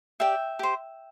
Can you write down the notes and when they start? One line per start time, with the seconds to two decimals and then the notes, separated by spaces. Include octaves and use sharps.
0.20 G4 D5 E5 G5
0.59 G4 C5